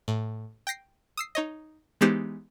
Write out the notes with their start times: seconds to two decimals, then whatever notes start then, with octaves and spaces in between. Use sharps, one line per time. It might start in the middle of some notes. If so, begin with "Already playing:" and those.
0.08 A2
0.67 G5 G6 A#6 C7
1.17 D#6 E6 C7
1.35 D#4 C#5 D#5
2.01 E3 G#3 B3 D#4 G4 C5